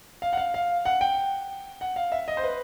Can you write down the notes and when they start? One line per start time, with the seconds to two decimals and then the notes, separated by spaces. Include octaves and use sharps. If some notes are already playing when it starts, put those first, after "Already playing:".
0.22 F5
0.33 F#5
0.37 F5
0.54 F5
0.85 F#5
1.01 G5
1.81 F#5
1.96 F5
2.12 E5
2.28 D#5
2.37 C5
2.44 B4